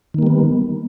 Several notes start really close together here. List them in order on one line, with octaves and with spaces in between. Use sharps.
D#3 A#3 G3 B3